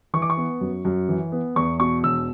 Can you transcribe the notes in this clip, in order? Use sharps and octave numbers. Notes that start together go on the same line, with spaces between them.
E3 C#6
D6
C#6
B3
F#2
F#2
E3
B3
E2 C#6
B2 C#6
E1 E6